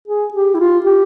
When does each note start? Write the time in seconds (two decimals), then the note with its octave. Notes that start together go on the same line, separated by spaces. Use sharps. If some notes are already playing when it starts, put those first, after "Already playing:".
0.08 G#4
0.34 G4
0.54 E4
0.60 F4
0.85 G4